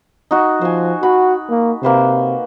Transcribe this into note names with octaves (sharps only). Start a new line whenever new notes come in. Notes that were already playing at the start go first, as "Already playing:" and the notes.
D#4 F#4
F3 C5 G#5
F#4 B5
A#3
C3 A#3 B4 C5